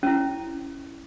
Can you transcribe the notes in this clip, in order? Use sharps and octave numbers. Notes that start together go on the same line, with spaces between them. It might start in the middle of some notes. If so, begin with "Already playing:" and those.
C#4 E4